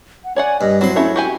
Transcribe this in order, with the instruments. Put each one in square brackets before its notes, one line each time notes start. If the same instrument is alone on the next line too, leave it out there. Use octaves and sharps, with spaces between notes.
[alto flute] F#5
[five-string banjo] C#5 D5 F#5 [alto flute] G#5
[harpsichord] G2 [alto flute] D#5
[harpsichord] F#3 C6 [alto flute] C4 [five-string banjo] E4
[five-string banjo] A3 C#4 E5 [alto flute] E4
[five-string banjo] F#4 G4 G#5